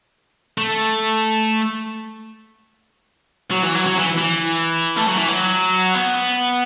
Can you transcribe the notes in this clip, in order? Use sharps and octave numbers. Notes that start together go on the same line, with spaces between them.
A3
F#3
E3
F#3
F#3
E3
E3
A3
F#3
E3
F#3
B3